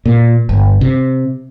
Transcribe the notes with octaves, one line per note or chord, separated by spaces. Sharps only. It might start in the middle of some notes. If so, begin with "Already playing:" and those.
A#2
G1
C3